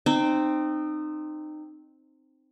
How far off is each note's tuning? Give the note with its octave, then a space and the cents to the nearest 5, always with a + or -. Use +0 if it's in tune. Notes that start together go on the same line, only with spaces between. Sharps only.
C4 +0 D#4 -25